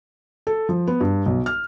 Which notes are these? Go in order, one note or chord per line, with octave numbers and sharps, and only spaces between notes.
A4
F3
B3
G2
B1
F6